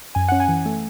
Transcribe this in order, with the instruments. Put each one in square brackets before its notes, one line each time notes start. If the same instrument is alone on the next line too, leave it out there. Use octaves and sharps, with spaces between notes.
[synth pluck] F#2 G#5
C#4 F#5
G#5
E3
A3